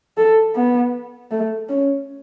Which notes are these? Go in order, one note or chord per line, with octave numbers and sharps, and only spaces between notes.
A4
B3
A3
C#4